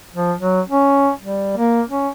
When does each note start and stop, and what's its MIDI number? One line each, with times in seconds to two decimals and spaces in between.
0.14 0.33 53
0.39 0.61 54
0.68 1.11 61
1.20 1.54 55
1.57 1.82 58
1.89 2.09 61